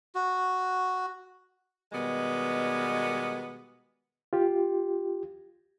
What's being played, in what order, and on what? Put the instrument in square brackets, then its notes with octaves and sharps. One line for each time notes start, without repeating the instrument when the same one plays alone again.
[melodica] F#4
[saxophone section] B2 D#3 G3 G#3 B3
[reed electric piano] F4 G4